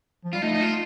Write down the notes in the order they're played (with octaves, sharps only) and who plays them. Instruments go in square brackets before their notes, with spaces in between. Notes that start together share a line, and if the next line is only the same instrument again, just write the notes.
[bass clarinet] F3
[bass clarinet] G3 [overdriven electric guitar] F4
[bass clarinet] A3 [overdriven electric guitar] D#4
[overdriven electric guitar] D#4
F4